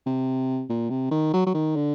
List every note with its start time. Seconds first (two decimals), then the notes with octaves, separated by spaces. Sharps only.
0.06 C3
0.70 A#2
0.90 C3
1.11 D#3
1.33 F#3
1.46 F#3
1.54 D#3
1.75 D3